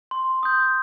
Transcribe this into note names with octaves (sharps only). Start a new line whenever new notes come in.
C6
D#6 G6